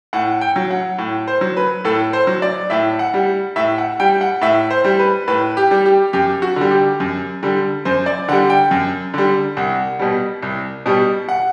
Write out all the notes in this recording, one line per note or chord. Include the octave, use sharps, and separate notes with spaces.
A2 F#5
G5
F#3
F#5
A2
C5
F#3
B4
A2 A4
C5
F#3
D5
A2 E5
F#5
G3
A2 E5
F#5
G3 G5
F#5
A2 E5
C5
G3
B4
A2 B4
G4
G3
G4
F#2 G4
F#4
D3 G3
G4
F#2
D3 G3
F#2 C5
D5
D3 G3 F#5
G5
F#2
D3 G3
C2 F#5
B2 G3
C2
B2 G3
F#5